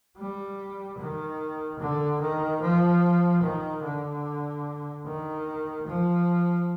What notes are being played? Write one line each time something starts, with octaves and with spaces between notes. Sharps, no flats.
G3
D#3
D3
D#3
F3
D#3
D3
D#3
F3